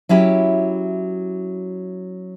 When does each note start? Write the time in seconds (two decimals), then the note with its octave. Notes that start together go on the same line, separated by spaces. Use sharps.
0.09 F#3 C#4 E4 G4